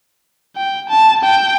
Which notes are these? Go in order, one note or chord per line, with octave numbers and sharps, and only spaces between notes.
G5
A5
G5